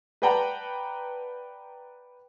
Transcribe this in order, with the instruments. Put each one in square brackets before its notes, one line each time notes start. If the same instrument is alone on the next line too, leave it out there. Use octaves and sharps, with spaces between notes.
[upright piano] B4 D5 F#5 G5 A5 A#5